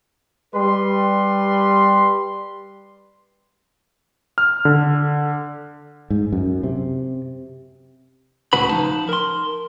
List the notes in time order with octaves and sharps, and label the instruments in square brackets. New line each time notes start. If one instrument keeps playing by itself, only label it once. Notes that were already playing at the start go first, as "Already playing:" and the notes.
[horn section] G3 B4 C6
[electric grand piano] F6
D3
[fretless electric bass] G#2
F#2
C3
[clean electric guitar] C#2 A2 C#3 F#4 B4 B5
F3 D#4 A5
A#4 C6